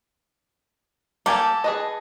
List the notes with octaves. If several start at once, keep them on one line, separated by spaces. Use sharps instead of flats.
A#3 G4 A4 G#5
G#4 B4 D#5